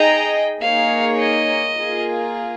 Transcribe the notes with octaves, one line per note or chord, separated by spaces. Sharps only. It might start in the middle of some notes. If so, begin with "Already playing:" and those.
Already playing: D#4 G#4 D#5 G5 A#5
A#3 D#4 G#4 C#5 F5
D#5
A#3 F4 G#4